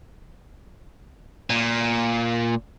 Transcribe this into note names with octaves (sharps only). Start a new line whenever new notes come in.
A#2